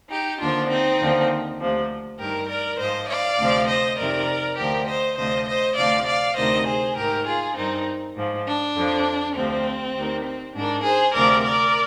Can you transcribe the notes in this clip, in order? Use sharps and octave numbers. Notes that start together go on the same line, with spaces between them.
D#4 G4
D#2 D3 F3 D4 F4
C4 D#4
D#2 D3 F3
D2 C3 F3
G2 D#3 G4 A#4
A#4 D5
G#2 F3 C5 D#5
D5 F5
D2 C3 F3
C5 D#5
F2 C3 D#3 A#4 D5
D2 D3 F3 G4 A#4
C5 D#5
D2 C3 F3 C5 D#5
C5 D#5
D2 C3 F3 D5 F5
D5 F5
D2 C3 D#3 C5 D#5
G#4 C5
G#2 D#3 G4 A#4
F4 G#4
G2 D#3 C4 D#4
G#2 F3
D4
F2 D3 F3
D2 C3 F3 C4
D2 C3 D#3
C4
G#2 D#3 D4
G#4 C5
D2 C3 F3 A#4 D5
A#4 D5